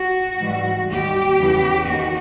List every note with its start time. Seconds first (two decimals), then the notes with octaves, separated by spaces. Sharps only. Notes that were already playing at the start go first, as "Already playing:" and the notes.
Already playing: F#4
0.40 G#2 E3 G3
0.89 D#2 D#3 G3 G4
1.39 E2 C#3 E3
1.88 D#2 D#3 F#4